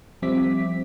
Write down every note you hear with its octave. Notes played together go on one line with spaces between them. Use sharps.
F3 G3 C4 E5 D6 B6